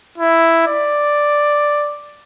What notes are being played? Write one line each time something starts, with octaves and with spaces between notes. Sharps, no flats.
E4
D5